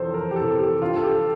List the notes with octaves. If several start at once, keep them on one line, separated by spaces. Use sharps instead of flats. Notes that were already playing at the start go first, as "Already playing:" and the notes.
Already playing: F2 C3 E3 A4 C5
A#4
G4
C3 E3 A4
G4
G2 F4
A4
G4
A4